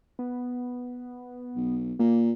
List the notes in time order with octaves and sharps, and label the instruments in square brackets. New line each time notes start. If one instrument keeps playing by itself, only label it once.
[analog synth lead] B3
[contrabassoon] B1
[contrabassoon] A#2 [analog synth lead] A#3